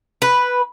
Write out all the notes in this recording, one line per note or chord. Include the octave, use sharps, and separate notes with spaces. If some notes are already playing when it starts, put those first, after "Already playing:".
B4